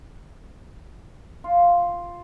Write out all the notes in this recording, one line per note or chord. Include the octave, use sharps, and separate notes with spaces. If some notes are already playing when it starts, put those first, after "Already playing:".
F4